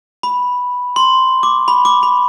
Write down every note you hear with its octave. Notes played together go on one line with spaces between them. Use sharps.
B5
C6
D6
B5
D6
B5